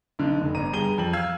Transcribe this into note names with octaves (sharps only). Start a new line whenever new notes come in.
B1 D3
F1
G1 A#5 D#7
G2 G#4 A#5 D#7 G7
F2 F#7
F5 E6 F6 G#6